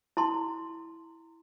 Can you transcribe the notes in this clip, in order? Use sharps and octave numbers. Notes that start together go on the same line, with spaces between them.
E4 A5 C6